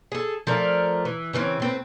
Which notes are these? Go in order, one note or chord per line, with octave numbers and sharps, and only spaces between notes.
G#4 A4
F3 A3 A#4 D5
E3
C#3 E3 A3 C4
A2 C4 B4